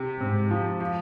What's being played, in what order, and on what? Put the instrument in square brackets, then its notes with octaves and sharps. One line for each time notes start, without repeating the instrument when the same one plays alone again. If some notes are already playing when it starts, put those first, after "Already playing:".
Already playing: [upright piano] C3 G4
[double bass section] G#2 [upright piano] C4
[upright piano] F3
F3